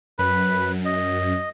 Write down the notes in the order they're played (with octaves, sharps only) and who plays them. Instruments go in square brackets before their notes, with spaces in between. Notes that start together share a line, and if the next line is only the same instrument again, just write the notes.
[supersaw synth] F#2 [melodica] B4 B5
[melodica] D#5